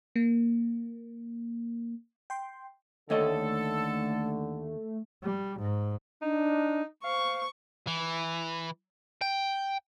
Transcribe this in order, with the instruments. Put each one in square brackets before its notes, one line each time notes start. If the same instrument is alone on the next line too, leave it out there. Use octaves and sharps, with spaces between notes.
[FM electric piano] A#3
G5 C6
[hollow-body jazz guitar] D#2 C#5 D#5 [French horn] D3 [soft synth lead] A3 [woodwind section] A4
[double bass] G3
G#2
[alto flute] D4 [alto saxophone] D#4
[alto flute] C5 [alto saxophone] F5 [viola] C#6
[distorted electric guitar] E3
G5